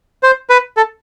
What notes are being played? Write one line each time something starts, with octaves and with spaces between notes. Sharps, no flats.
C5
B4
A4